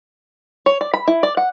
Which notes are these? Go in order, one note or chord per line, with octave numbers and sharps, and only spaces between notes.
C#5
D5
B5
E4
D5
F#5